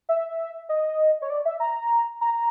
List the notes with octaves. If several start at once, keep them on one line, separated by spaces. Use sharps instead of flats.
E5
D#5
C#5
D5
E5
A#5
A#5